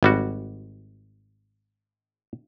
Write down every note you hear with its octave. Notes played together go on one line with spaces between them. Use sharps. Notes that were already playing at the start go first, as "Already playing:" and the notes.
G#1 G3 F#4